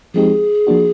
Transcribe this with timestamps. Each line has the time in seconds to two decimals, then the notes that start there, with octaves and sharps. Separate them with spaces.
0.14 F3 G#3 C4 D#4 G4 G#4
0.67 F3 A#3 D4 F#4